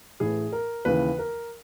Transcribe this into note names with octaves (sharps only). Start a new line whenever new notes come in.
A1 A2 E3 G#4
A#4
D#2 C#3 E3 B4
A#4